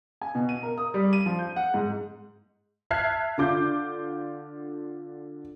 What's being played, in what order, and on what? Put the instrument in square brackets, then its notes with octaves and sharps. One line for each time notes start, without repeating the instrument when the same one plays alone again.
[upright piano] G#5
B2
D#7
A#4
D#6
G3
D#7
F3
G6
F#5
G#2
[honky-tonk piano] E5 A5 F6 F#6 G#6 C7
D3 F4 D6 G6